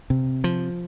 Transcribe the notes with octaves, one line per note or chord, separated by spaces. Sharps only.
C3
F3